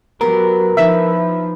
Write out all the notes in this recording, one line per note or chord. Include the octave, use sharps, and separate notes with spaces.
F#3 B3 G4 A#4 C6
F3 D#4 E4 B4 E5